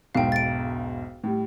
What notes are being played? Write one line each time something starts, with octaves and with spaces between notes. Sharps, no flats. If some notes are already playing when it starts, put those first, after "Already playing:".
E1 B1 G#2 F5 G5
A6 D7
A2 G3